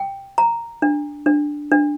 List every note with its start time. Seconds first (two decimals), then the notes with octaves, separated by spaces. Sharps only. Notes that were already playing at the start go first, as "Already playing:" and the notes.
Already playing: G5
0.38 A#5
0.82 D4
1.26 D4
1.72 D4